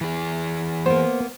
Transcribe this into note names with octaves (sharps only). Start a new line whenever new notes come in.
E3 G#4
A#3 B3 C5